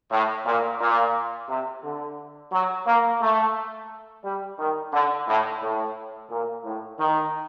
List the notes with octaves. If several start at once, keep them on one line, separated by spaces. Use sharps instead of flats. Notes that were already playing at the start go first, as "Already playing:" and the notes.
A2
A#2
A#2
C3
D3
F#3
A#3
A3
G3
D#3
D3
A2
A2
A#2
A2
D#3